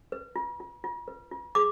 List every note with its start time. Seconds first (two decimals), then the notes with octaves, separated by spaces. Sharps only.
0.12 B4
0.36 F4
0.60 F4
0.84 F4
1.08 B4
1.31 F4
1.55 G#4 D6